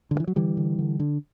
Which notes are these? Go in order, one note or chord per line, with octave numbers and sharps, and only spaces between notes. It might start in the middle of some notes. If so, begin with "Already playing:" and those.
D3
G2
E3
F#3
D3 E3 G3
D3
D3
D3